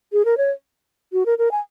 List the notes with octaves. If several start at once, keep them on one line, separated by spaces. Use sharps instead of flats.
G#4
A#4
C#5
F#4
A#4
A#4
G#5